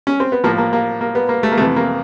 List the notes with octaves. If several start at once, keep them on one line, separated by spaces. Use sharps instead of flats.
C#4
C4
B3
A2 F3 A#3
A#3
A#3
A#3
B3
A#3
A3
A#3
F2 C3 E3 A3
A#3